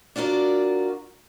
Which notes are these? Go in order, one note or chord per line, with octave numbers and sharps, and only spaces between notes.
D4 F4 F#4 A#4 D5